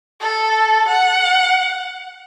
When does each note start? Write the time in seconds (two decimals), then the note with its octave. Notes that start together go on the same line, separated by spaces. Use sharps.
0.20 A4
0.89 F#5